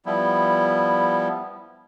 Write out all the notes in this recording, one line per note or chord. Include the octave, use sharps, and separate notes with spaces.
F3 G3 B3 E4